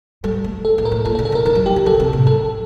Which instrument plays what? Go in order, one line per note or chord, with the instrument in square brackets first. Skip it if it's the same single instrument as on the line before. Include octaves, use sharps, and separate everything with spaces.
[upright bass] G3 [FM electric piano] A4
[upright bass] A3
[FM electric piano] A4
[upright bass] A2
[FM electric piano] A#4
[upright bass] A2
[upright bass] A#2 [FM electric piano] A4
[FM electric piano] A4
[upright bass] D3
[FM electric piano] A4
[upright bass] D3
[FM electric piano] A#4
[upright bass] D#3 [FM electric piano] A#4
[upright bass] F#3
[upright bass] F#3 [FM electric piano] G4
[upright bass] D#3
[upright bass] D3 [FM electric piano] A4
[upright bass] C3
A2
[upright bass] F#2 [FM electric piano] A4